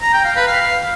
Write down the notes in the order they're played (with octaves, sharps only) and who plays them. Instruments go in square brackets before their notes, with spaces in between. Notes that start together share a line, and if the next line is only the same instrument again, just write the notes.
[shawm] A#5
G5
F5
B4
F5